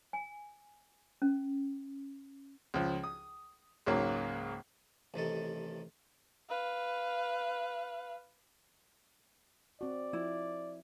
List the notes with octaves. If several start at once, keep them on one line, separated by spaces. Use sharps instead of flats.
G#5
C#4
C#2 F3
D#6
C#2 G#2 F#3 A#3
A1 C3 D#3 A4
B4 F5
C4 F#4 D5
F3 E4